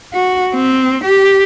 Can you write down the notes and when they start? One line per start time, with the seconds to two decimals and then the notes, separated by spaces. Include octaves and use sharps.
0.13 F#4
0.54 C4
1.04 G4